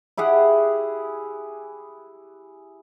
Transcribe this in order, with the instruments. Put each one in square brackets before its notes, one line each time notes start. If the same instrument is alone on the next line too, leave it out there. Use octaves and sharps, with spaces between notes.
[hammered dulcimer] E4 G4 G#4 F#5